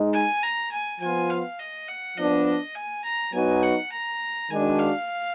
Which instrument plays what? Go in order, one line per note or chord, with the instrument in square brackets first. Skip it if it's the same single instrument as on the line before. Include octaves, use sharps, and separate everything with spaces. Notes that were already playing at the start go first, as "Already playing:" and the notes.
Already playing: [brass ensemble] G#3 D#4
[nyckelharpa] G#5
A#5
G#5
[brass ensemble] F3 B3 F4 [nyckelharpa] G#5
[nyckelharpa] F5
D#5
F#5
[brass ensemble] F3 B3 D4 [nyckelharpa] D#5
[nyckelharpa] D#5
G#5
A#5
[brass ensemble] F#3 B3 D#4 F#4 [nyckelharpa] G#5
[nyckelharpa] F#5
A#5
[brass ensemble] D#3 G#3 D4 F#4 [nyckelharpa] G#5
[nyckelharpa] F5